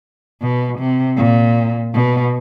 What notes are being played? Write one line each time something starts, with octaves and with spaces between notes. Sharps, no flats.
B2
C3
A#2
B2